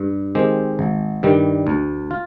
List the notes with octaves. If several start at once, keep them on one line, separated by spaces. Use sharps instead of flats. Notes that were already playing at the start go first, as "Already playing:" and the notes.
Already playing: G2
D#3 G#3 C4 G4
G#1
G2 D#3 G3
D2
F4